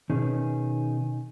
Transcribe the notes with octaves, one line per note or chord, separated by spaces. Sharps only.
B2 D#3 C#4 D#4 G#4